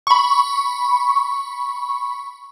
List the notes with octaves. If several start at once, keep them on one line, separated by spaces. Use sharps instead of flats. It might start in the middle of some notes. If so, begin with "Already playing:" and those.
B5 C#6